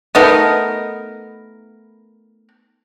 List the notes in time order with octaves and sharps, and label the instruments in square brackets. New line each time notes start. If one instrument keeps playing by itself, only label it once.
[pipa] A3 B3 D#4 A#4